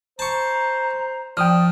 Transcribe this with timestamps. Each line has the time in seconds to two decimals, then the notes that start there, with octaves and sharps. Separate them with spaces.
0.19 C5 A5 A#5 C#6
1.37 F3 D5 G5 D#6 F6